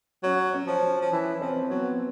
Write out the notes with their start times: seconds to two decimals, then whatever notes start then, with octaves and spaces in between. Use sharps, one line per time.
0.23 F#3 C#4
0.53 C#4
0.67 F3
0.82 C#4
1.02 F3
1.12 E3
1.41 F3 C4
1.70 F#3 B3